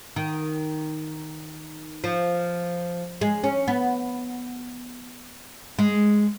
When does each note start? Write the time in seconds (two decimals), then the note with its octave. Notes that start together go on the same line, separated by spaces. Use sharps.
0.16 D#3
2.04 F3
3.21 G#3
3.44 C#4
3.68 B3
5.79 G#3